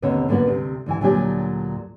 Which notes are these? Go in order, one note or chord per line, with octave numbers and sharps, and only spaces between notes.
D#2 B2 D3 A#3 C4 C#5
F#2 D3 A#3 B3 F#4
D2 C3
D2 E3 G#5
D2 A#2 F#3 D4 G4 G#5